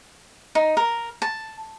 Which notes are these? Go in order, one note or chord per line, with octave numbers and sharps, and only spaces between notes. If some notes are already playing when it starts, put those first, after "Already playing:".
D#4
A#4
A5